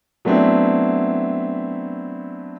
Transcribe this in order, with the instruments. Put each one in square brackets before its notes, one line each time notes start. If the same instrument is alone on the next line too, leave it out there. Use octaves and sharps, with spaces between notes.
[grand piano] F#3 A3 B3 C4 D4 E4